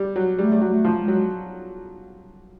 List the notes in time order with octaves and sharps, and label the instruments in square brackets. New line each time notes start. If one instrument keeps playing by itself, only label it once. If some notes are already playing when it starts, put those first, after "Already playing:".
Already playing: [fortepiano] G3
F#3
[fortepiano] G3 [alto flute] A3
[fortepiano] G3
F#3
[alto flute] A3
[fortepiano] F3
[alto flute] G#3
[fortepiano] F#3